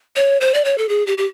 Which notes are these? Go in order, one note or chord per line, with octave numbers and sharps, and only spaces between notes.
C#5
C5
D5
C#5
A4
G#4
G4
G4